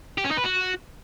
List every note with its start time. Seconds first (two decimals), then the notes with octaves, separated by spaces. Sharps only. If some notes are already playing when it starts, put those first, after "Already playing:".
0.18 G4
0.24 C#4
0.31 D#4
0.37 B4
0.44 F#4